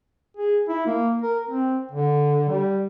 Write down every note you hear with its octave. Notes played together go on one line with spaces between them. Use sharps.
G#4
E4
A#3
A#4
C4
D3
G3